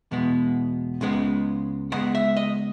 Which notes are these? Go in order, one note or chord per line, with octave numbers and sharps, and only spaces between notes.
E2 B2 G#3 B3
C#2 C#3 G#3 B3
C#2 C#3 G#3 B3 F#5
E5
D#5